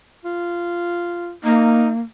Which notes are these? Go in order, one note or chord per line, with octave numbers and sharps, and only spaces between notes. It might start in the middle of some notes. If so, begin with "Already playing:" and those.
F4
A#3 D#4